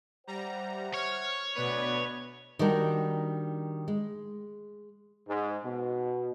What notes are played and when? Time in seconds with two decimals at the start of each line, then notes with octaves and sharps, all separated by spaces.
0.27 G3 C5 E5 F#5 A#5
0.94 C#5 F6
1.55 D2 B2 B3 B4 D5
2.59 D#3 G3 D4 D#4 F#4 A#4
3.88 G#3
5.28 G#2
5.64 B2